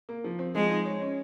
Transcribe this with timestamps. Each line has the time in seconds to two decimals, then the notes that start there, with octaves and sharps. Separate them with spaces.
0.09 A#3
0.24 F3
0.39 C4
0.55 F3 G#3
0.70 D#4
0.85 C#5
1.02 C#4